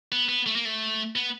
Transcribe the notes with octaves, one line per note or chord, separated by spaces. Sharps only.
B3
B3
A3
A#3
A3
B3